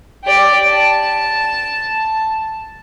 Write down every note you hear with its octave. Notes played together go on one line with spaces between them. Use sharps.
G4 D5
A5